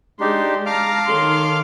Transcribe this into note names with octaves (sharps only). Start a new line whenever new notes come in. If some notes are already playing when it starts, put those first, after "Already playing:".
G#3 D4 D#4 G4 C6
F5 A5 A#5 D6 F6
D#3 A4 C#5 C6